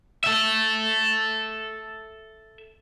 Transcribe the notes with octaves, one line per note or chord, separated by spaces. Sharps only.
A4 E5